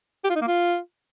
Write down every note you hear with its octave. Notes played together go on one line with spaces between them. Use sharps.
G4
F4
D#4
A#3
F4